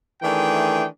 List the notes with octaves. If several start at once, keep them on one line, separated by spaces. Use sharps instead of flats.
D#3 E3 A3 D4 G#4 G5